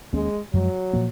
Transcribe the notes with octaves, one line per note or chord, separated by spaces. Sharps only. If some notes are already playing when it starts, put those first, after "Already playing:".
D#2 D#3 G#3 A#3 C#4
F#2 F3 F#3 G#3
A#2 F3 A#3